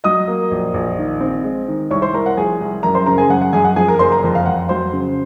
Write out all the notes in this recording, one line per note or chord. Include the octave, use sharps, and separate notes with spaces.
F#3 D#5 D#6
A#3
A#1
A#1
D#3
C4
G#3
D#3
C2 C#5 C#6
C5 C6
C2 A#4 A#5
F#5
F3 G#4 G#5
C2
F#2 A#4 A#5
C5 C6
C#3 A#4 A#5
G#4 G#5
F#2 F#5
F#5
F#2 G#4 G#5
F#5
F3 G#4 G#5
A#4 A#5
F#1 C5 C6
A#4 A#5
F2
F5
F2 F#5
F#3 C5 C6
C#3